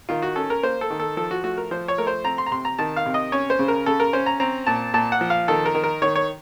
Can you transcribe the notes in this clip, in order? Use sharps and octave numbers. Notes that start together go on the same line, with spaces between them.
D#3 F4
F#4
C#4 A4
A#4
A#3 C5
A4
D#3
A4
F3 A4
F#4
A3 F#4
A#4
F3 C5
C#5
A3 A#4
C5
C4 A#5
C6
A#5
C3 C6
A#5
D#3 A5
F5
C3
D#5
C#4 C#5
C5
C#3
A#4
C#3 A4
A#4
C#4 C5
A#5
C4 A#5
A#2 A5
A#2 A5
F#5
F3
F5
D#3 A4
A#4
D#3
A#4
D#3 C#5
C#5